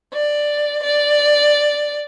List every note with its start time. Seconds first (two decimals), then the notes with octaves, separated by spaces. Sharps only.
0.13 D5
0.84 D5